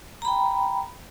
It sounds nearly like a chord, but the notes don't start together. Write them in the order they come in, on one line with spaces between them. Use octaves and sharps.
A#5 B5 G5